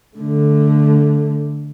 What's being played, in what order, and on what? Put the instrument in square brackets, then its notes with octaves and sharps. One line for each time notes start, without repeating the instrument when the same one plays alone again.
[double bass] D3 A3